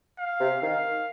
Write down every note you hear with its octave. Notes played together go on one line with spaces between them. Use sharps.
F5
C3
D#3 F5